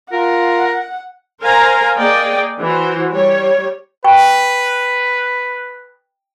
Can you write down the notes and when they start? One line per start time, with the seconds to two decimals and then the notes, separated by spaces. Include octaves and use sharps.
0.13 F4 A#4 F#5
1.42 A#4 C5 F5 G#5 A#5
1.98 A#3 G#4 D5 D#5 G5
2.62 E3 F#4 C5
3.12 G3 C#5
4.04 B4 G5 C#6